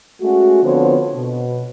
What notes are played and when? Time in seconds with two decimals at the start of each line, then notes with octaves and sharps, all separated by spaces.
0.21 G#3 A3 C#4 F#4
0.63 D3 F3 B3 C4 F4 C#5
1.14 B2